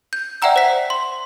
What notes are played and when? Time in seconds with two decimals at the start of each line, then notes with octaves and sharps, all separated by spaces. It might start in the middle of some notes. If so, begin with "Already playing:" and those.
0.13 G6
0.42 D5 E5 F#5 G5 A#5 E6
0.56 C5 B6
0.90 C6